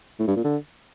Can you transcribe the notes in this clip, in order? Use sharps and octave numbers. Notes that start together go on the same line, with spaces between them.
A2
G2
A#2
D3